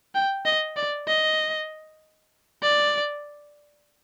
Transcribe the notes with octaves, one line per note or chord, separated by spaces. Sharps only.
G5
D#5
D5
D#5
D5